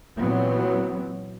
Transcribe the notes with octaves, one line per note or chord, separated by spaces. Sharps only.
A#2 E3 F#3 B3 C4